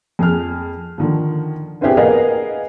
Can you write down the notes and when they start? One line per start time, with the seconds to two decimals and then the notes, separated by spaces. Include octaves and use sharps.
0.19 F2 G#4 F6
0.98 D3 D#3 F3
1.81 B3 C4 D4 E4 G4 G#4
1.97 B3 G#4 A#4 D#5 F5